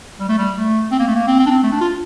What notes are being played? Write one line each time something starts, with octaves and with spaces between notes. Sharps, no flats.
G3
A3
G3
A3
C4
A#3
A3
A#3
C4
C4
D4
C4
A3
D4
F4